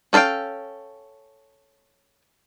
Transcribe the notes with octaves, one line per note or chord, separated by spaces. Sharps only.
C#4 A4 B4 F5 G5